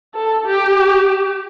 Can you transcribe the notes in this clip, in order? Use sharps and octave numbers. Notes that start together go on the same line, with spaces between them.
A4
G4